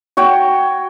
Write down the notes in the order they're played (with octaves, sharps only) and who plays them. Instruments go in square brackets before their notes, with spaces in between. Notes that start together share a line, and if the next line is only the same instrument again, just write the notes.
[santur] F#4 C#5 G5